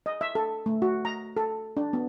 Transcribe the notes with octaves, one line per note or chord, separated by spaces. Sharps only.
D#5
E5
A4
A3
F#4
A#5
A4
D4
B3